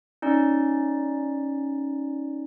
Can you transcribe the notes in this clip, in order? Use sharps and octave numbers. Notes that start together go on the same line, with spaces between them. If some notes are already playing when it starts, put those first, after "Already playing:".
C#4 D#4 D5